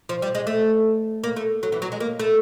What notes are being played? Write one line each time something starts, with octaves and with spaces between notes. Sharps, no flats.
F3
G3
G#3
A3
A#3
A3
F#3
E3
F#3
G#3
A#3
A3